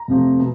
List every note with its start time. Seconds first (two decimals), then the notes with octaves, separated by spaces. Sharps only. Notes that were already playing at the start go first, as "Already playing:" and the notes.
Already playing: A#5
0.08 F2 C3 F3 A3
0.39 B2